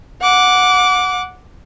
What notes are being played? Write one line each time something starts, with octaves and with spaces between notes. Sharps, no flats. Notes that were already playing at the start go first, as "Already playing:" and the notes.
F#5 D6